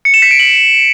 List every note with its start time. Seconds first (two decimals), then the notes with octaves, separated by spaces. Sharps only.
0.05 C#7
0.14 E7
0.22 B6
0.31 D7
0.39 F#7